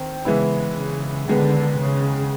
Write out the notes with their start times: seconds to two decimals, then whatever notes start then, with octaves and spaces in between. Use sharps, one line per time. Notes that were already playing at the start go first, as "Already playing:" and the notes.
Already playing: D#3 C4
0.25 C#3 E3 G#3 B3 E4
0.76 C#3
1.28 D3 D#3 G#3 B3
1.79 C#3